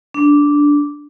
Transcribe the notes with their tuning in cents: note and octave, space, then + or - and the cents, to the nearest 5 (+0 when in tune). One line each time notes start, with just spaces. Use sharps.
D4 -10